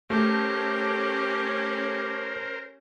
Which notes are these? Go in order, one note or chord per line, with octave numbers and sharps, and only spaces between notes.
A3 C#4 G4 A#4 C5